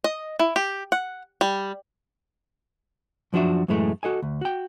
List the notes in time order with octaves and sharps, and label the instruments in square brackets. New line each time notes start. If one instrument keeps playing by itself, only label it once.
[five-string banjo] D#5
E4
G4
F#5
G3
[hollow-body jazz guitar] F#2 F3 D4 F#4 E5
F#2 A2 E3 G#3 A3
F#4 A4 D#5 G#5
D2
F#4 G5